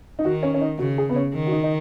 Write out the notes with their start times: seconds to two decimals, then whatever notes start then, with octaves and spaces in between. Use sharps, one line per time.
0.19 D#4
0.24 D#3 F#4
0.43 C#4
0.54 C#4
0.61 D#4
0.79 C#3 F#4
0.98 G#4
1.09 B3
1.16 C#4
1.34 D#3
1.47 F#4
1.52 D#4
1.64 D#4